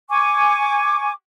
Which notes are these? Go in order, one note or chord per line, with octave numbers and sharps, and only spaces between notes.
G#5 C#6 D6